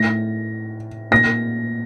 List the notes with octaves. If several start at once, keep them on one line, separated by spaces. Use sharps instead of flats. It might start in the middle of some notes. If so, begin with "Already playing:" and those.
Already playing: A2 A#6
A#2 A#6